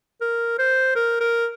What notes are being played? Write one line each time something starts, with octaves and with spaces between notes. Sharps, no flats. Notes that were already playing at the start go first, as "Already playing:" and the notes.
A#4
C5
A#4
A#4